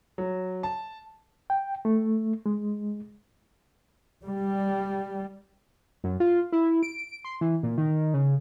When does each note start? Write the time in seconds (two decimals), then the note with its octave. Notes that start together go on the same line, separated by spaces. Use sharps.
0.18 F#3
0.63 A5
1.50 G5
1.85 A3
2.46 G#3
4.25 G3
6.04 F#2
6.20 F4
6.52 E4
6.83 D7
7.25 C6
7.41 E3
7.63 A#2
7.78 D#3
8.14 C#3